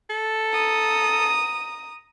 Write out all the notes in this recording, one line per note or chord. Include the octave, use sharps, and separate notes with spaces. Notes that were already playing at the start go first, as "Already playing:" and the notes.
A4
A#5 D#6